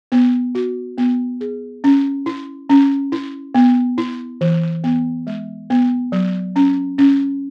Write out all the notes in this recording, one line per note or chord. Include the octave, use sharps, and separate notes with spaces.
B3
F#4
B3
G#4
C#4
E4
C#4
E4
B3
E4
E3
B3
G#3
B3
F#3
C#4
C#4